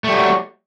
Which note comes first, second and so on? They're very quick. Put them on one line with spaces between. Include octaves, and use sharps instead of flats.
A3 G3 F#3